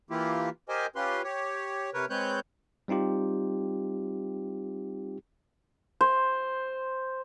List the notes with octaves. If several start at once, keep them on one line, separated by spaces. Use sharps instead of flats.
E3 A#3 E4 F4 G4
G4 A#4 C5 D#5 G#5
C#4 F4 G4 B4 C6
G4 C#5
C3 A#4 B4 C#5
G#3 C4 B4 C#5 F#6 G6
G3 C4 D#4 F4 G4
C5